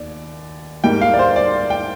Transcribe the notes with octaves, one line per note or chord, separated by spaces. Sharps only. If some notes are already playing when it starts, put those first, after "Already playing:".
Already playing: D#2 D5
G#2 G3 A#3 G5
F5
D5
C5
D5
G5